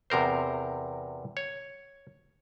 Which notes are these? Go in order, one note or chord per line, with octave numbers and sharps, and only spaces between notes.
E2 C3 A#4 C5
C#5